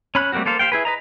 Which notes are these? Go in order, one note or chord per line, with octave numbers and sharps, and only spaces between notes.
C#4 B5 F#6
G3 A3 A#3 C4 F#4
A#3 A4 C5 F5
G4 C5 F5 G5
E4 G#4 B4
B4 D#5 A#5